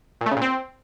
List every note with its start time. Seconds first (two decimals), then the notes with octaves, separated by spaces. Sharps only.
0.21 A#2
0.26 A3
0.31 C#3
0.36 A#2
0.42 C4